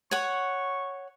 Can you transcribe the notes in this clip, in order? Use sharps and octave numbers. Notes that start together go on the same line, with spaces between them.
C#5 F#5 C#6